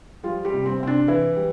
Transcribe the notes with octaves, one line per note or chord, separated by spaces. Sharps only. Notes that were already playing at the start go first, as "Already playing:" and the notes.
F3 G3 F4
G3 G4
C3
C4
C3 C4
D4
E3 E4
G3